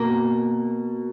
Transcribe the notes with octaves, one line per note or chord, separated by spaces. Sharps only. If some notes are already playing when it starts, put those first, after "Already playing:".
Already playing: B2 A#3